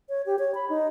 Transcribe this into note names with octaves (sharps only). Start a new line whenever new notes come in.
C#5
G4
C#5
B5
D#4